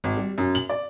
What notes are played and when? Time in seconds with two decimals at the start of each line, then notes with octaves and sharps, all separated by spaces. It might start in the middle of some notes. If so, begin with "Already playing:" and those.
0.04 G#1
0.17 G3
0.38 F#2
0.55 F#7
0.70 D5